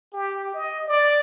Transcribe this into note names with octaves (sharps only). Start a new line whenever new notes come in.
G4
D#5
D5